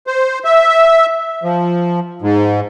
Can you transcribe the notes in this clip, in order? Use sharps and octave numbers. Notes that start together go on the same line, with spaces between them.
C5
E5
F3
G#2